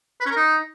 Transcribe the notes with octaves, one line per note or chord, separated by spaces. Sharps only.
B4
C#4
A#4
D#4